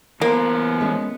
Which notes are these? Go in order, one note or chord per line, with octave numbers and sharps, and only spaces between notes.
E3 A#3 B3 C5
G#3 C#4